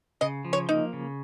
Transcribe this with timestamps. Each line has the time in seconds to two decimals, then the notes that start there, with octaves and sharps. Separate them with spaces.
0.21 C#3 D#5
0.45 F3
0.53 C#5
0.69 A#3 D#4
0.93 C#3